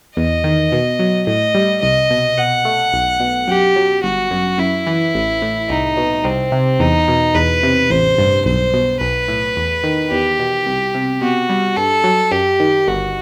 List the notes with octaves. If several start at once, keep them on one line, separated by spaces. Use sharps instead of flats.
E2 D#5
D#3
B2
F#3
A2 D#5
G3
C2 D#5
B2
B2 F#5
A3
B1
B2
F#2 G4
F#3
G1 F#4
F#2
F#2 E4
E3
A1
A2
C2 D#4
B2
C2 C4
C3
E2 D#4
B2
E2 B4
C3
A1 C5
G2
B1 C5
B2
B1 B4
A2
E2
D#3
E2 G4
B2
C2
C3
B2 F#4
G3
G2 A4
F#3
F#2 G4
D#3
G1 F#4